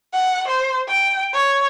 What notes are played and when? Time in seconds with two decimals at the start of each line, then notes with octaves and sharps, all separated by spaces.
0.13 F#5
0.48 C5
0.88 G5
1.33 C#5